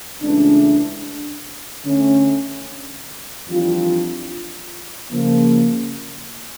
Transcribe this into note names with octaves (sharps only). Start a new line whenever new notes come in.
C#2 C#3 E3 A3 D4
D3 A3 C#4
F2 E3 G3 D4 F4
C#3 F3 A#3